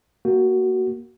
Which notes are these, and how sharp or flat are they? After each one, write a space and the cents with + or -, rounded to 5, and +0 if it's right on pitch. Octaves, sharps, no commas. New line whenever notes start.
A#3 +0 F#4 +15